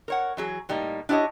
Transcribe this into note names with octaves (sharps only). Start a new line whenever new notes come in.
A#4 C#5 F#5
E3 F#3 G#4
A2 G3 A#3 D#4
D4 E4 G4 C#5 D#5